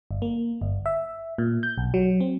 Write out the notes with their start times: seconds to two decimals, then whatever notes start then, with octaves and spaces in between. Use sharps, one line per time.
0.11 G1
0.22 A#3
0.61 G1
0.86 E5
1.38 A#2
1.63 G6
1.78 B1
1.94 F#3
2.20 C4